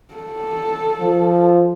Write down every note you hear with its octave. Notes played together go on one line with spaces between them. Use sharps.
A4
F3